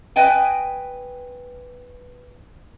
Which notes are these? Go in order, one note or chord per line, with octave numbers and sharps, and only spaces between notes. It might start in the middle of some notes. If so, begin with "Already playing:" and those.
B4 D#5 G5 G#5